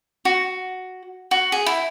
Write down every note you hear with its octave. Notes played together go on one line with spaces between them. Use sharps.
F#4
F#4
G#4
E4